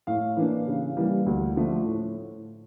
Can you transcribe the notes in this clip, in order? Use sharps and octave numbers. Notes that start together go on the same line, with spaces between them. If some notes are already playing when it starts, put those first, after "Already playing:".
A2 F5
E3 A#3 D4
C#3
E3 G3 A#3
D2
D3 F3 A3 D4
A2